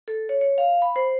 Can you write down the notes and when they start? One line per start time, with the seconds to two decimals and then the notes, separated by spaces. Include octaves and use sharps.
0.08 A4
0.29 C#5
0.41 C#5
0.58 F5
0.82 B5
0.96 C5